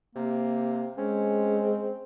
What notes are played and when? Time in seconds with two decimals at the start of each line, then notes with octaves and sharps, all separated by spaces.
0.16 C3 A#3
0.98 G#3 C4 C#4